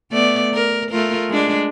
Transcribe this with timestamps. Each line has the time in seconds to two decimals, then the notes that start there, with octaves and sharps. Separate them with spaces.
0.11 A3 B3 D5
0.54 A#4
0.91 A3 F4 A#4
1.30 G#3 D4